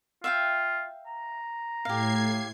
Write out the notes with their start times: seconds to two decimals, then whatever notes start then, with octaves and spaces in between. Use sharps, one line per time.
0.24 F4 E5 F5 G5
1.07 A#5
1.85 A2 G4 F5 G#6 C7